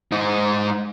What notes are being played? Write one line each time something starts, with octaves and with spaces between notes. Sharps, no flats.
G#2 D#4